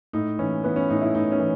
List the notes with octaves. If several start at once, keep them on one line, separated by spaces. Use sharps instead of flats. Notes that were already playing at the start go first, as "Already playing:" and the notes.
A2 D#4
E3 C#4
E3 B3
C#4
A2 D#4
E4
A2 D#4
C#4
E3